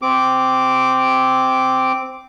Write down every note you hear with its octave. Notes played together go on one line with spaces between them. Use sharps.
C4 D6